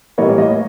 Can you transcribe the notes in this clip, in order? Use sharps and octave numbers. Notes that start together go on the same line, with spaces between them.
A2 E3 G3 A#3 C#5 D#5
C#5 D#5